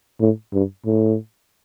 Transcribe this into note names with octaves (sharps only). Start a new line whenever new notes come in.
A2
G2
A2